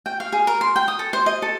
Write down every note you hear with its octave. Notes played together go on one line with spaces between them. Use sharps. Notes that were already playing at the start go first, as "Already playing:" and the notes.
G5
F5
G#4
A#4
C6
G5
D#6
A4
C5
D#5
A4